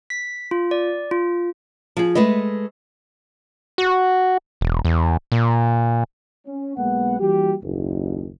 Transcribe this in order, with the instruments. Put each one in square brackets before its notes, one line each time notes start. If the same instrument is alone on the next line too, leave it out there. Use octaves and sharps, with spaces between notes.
[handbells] B6
F4
D5
F4
[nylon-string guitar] F3 G#4
G#3 A3 B4 D#5
[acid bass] F#4
E1
E2
A#2
[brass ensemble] C#4
B1 G#3 A#3 B3 B4 F#5
E3 G3 A#3 F#4 G4
F#1 D#2